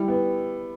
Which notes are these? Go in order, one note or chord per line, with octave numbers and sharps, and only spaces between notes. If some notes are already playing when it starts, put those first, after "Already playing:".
Already playing: G3 E4
B3